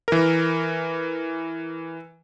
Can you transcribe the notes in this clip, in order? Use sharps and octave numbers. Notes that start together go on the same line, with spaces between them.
E3 A#4